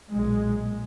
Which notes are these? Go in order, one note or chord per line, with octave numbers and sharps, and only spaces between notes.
B1 A#2 G#3